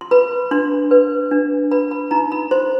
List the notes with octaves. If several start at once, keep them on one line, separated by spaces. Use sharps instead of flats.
C6
B4 B5
D4 C6
B4
D4
B4 B5
B5
D#4 A#5
B5
C5 C6